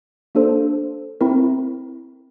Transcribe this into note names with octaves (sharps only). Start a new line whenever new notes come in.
A#3 D4 A4 C5
C4 E4 A#4